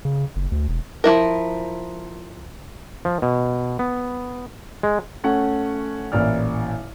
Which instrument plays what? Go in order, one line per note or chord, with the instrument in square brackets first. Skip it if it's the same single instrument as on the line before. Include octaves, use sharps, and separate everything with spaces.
[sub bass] C#3
F#1
D2
E1
[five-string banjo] F3 A3 E4 A#4
[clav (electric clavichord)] F3
B2
B3
G#3
[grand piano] A3 C#4 F#5
A1 A#2 E4 D5 F6